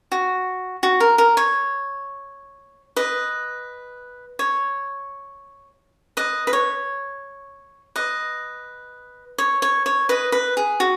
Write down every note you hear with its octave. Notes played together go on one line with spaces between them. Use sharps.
F#4
F#4
A#4
A#4
C#5
B4 D#5
C#5
B4 D#5
B4
C#5
B4 D#5
C#5
C#5
C#5
B4 D#5
B4
G#4
F#4